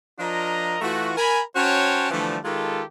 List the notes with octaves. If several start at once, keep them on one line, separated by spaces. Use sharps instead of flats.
F3 D4 F4 A#4 D#5 A#5
E3 A3 F4 F#4
A#4 G#5 B5
C#4 F#4 C5 C#5 G5 A5
D3 E3 F3 G3 A3
D#3 G#3 F4 G4 A4